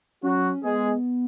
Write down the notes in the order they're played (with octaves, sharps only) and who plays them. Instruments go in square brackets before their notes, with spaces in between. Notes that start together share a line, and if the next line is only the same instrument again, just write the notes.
[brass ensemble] F#3 F#4 [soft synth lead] C#4
[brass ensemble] G#3 G#4 [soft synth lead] B3